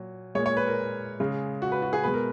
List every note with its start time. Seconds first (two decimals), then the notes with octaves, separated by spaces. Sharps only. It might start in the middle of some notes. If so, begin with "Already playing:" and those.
Already playing: A#2 F#3
0.35 G#3 C#5
0.38 A#2
0.46 C#5
0.57 B4
0.67 A#4
1.20 C#3 G#3
1.62 F#4
1.72 B4
1.82 F#4
1.93 G#4
2.04 B2 G#3 B4
2.14 A#4